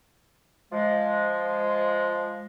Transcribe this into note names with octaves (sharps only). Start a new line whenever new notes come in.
F3 G#3